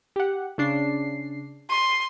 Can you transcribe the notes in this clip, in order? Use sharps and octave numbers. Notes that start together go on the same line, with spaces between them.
G4 F#5
C#3 D4 C7
C6 D#7